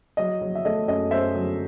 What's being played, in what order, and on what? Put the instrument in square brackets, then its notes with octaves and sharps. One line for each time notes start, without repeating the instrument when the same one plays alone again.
[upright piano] F#3 D#5
F#3
E5
A3 D#5
F#2 D#5
F#2 C5 E5
F#3